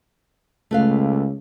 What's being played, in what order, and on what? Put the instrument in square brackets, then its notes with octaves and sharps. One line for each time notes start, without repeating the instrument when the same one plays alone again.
[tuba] C#2 [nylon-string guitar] A3 B4 F5